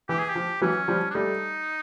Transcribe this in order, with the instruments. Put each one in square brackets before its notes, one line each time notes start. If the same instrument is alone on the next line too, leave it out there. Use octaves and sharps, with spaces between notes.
[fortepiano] E3 [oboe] G4
[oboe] G#4
G4
[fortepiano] F3
[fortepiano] E3 F#3 [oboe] C#4
[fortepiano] F3 G3
[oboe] D4
[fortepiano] G3 A3 [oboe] D#4